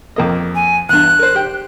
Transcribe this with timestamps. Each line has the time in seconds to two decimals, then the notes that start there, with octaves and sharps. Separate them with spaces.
0.16 F2 A#3 D#5
0.55 G#5
0.89 E2 G2 F#6
1.19 A#4 C5
1.35 G4 G5